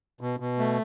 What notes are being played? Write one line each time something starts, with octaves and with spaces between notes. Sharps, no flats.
B2
B2
A3